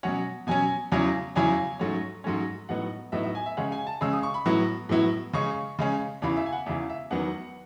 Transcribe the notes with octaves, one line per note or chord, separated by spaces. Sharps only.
B2 F#3 C#4 F#5
B2 F#3 C#4 G#5
E2 C#3 F#3 C#4 E4
E2 C#3 F#3 C#4 E4 G#5
G#2 F#3 A3 C#4
G#2 F#3 A3 C#4
A2 F#3 B3 D#4 F#5
A2 F#3 B3 D#4 E5
E5
G#5
E5
C#3 G#3 C#4 F#5
G#5
A5
C#3 G#3 C#4 E6
D#6
C#6
B5
A2 F#3 B3 E4
A2 F#3 B3 E4
C#3 G#3 C#4 C#6
C#3 G#3 C#4
E2 C#3 E3 B5
E5
G#5
F#5
E2 C#3 E3 E5
E5
E2 D#3 F#3 B3 F#5